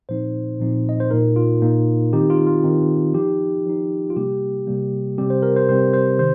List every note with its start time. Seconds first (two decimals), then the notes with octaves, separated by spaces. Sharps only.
0.09 A#2 F3 C4 D#4 C5
0.60 A#2 F3 C4 D#4
0.89 D#5
1.00 C5
1.11 A#2 A#3 D#4 A#4
1.36 F4
1.62 A#2 A#3 D#4
2.13 D#3 C4 D#4 G4
2.30 F4
2.47 F4
2.64 D#3 C4 D#4
3.14 F3 D#4 G4
3.66 F3 D#4
4.10 F4
4.16 C3 G3 A#3 G4
4.67 C3 G3 A#3
5.18 C3 G3 C4 G4
5.30 C5
5.43 A#4
5.56 C5
5.69 C3 G3 C4 C5
5.93 C5
6.19 C3 D#3 C5